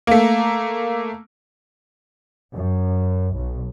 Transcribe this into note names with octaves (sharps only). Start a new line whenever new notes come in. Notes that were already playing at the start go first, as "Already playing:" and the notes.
A3 A#3
F#2
B1